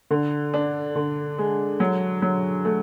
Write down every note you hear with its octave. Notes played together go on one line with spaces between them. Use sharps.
D3
D4
D3
G#3
F#3
F#3
A3